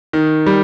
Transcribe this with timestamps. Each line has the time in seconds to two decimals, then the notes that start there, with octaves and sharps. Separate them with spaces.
0.13 D#3
0.46 G3